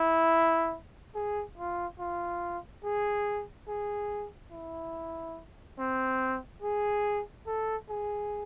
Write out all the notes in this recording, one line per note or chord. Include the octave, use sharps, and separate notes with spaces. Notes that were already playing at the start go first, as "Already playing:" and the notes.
Already playing: E4
G#4
F4
F4
G#4
G#4
E4
C4
G#4
A4
G#4